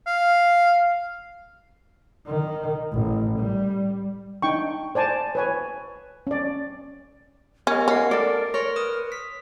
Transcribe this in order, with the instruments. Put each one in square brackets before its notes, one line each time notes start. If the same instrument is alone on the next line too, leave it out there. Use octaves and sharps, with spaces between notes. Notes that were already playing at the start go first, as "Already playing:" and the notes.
[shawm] F5
[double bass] D#3
A1
G3
[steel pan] D4 D#4 G5 C#6
C5 D5 G#5 A5
B4 C#5 G#5
C#4 D5
[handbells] B3 G4 D#5 [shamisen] C#4 [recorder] A#4
[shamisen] C#4 [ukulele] F#4 [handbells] F#5 C7
[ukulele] A4 D5
[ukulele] C#5 [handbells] C6 F6 A#6
[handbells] B4 D#6
B6